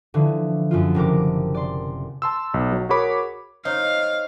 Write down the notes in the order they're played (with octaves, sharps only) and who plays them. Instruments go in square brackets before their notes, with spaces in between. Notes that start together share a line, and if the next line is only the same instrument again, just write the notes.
[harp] D3 E3 F3
F#2 F3 F4
F#1 C3 A#4 D6
D5 C6
[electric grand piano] A5 C6 E6
B1
F#3
F#4 G#4 A#4 C#5 B5 D6
[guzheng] D#4 [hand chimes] C5 C#5 D#5 [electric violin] F5